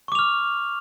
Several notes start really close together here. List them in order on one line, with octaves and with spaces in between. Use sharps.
C#6 D6 F7 F6